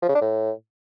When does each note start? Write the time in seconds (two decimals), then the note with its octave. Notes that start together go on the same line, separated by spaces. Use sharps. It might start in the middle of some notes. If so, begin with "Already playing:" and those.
0.02 F3
0.09 C#3
0.15 D4
0.21 A2